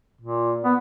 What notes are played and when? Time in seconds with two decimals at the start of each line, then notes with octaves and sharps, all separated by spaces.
0.21 A#2
0.64 B3